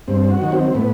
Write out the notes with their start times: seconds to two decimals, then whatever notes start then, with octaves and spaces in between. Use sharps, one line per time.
0.08 G2 C4
0.30 F#4
0.42 D#3 F#3
0.52 C4
0.75 A2 B3